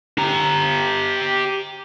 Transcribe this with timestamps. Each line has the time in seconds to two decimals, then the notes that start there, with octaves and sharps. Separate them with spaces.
0.18 G4 A#5